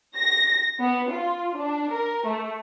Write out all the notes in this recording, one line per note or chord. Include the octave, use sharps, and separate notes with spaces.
A#6
B3
F4
D4
A#4
A3